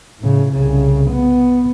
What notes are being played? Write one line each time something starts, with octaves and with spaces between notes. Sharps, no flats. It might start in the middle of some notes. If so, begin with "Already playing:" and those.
A2 C#3
C2 C#3
B3